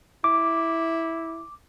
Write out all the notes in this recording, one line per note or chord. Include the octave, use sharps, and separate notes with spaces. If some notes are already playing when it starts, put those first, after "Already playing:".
E4 D6